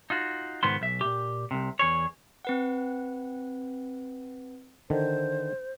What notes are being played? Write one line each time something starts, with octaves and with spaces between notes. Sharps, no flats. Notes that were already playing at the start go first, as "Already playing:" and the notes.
D#4 F4 F#4
C#2 G#2 D#3 B3 C5 C6
B1 E5
A#2 G4
C2 C3
E2 G#4 C#5
C4 B4 F#5
D3 D#3 C5